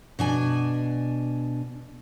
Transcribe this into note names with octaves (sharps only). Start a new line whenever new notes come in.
B2 D4 G#5